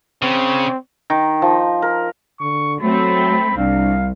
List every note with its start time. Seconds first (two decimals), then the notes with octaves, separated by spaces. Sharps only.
0.22 C#3 C4
1.10 D#3
1.42 F3
1.82 A#4
2.41 D3 C#6
2.81 F#3 A3 C4 B5
3.58 C2 D4 F5